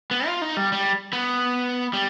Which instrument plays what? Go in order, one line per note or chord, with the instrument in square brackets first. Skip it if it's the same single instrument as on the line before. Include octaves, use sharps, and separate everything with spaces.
[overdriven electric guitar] B3
F4
D#4
G3
G3
B3
G3